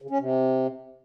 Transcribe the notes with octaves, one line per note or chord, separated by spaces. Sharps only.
C#3
C#4
C3